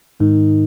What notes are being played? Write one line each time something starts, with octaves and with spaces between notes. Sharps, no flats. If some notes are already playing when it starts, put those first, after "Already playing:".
G#2 D#3